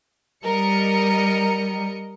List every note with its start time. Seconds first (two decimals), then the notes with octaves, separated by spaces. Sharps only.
0.44 G3 A#4 D#5 C#7